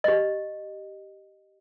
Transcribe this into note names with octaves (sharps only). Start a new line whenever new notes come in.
G4 D#5